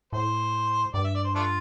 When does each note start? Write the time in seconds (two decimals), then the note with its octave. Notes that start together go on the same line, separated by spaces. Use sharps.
0.13 A2 C5
0.94 G2 D5
1.04 E5
1.15 D5
1.25 C5
1.35 A3 D4 F4